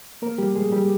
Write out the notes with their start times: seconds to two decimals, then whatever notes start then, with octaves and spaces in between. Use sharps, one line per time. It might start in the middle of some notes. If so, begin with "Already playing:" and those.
0.22 A#3 A#4
0.38 G3 G4
0.56 G#3 G#4
0.72 G3 G4